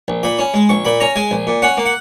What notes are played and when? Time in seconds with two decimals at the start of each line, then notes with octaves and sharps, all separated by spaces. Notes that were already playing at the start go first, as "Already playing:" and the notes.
0.08 A#1
0.23 A#2 B5
0.39 C#4
0.54 G#3
0.69 A#1 C#6
0.85 A#2 B5
1.00 C#4 A#5
1.16 G#3 G#5
1.31 A#1
1.47 A#2
1.62 C#4 F#5
1.77 A#3
1.85 F#5